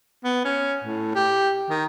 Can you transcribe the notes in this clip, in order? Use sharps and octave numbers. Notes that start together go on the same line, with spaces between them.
B3
C#4
A2
G4
D#3